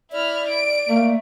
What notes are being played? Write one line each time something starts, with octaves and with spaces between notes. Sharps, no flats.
E4 D5 F6
D7
A3 A#3